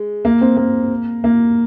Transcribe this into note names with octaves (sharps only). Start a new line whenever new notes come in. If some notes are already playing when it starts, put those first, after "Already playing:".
Already playing: G#3
A#3
C4
A#3
A#3